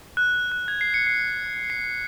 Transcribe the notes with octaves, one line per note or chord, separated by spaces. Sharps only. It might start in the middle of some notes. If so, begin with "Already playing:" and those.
F#6
F#6
G#6
C7
C#7
C7
C7